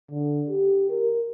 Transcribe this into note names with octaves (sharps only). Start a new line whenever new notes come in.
D3
G4
A#4